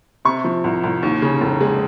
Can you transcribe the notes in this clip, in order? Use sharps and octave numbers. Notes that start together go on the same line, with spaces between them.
C3 C#6
F3
C2
C2
D#2
C#3
F1
G#3